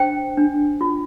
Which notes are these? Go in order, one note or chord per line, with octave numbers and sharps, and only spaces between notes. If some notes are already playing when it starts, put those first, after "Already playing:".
Already playing: D4 C5 G5
D4
F4